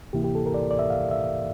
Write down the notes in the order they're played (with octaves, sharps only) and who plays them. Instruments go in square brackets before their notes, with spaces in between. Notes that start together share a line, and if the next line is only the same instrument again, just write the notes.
[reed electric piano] D2 C3 E3 A#3 E4 G4
G4
A4
A#4
D5
D5
E5
F5
E5